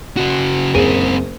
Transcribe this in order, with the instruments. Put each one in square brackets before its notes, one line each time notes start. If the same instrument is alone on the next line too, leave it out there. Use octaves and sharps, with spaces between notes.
[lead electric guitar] C#3 F#4
[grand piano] F#1 G#4 D#7 [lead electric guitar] C4 A#4